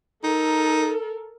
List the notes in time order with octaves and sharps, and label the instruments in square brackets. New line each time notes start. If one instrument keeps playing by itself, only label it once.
[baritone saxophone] D#4 [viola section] A4 A#4